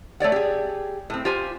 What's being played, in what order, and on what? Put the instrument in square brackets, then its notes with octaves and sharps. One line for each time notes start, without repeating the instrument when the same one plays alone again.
[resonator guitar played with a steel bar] A3 C#5 D5 F#5
G4 G#4
A2 C4
F4 G4 C5 G#5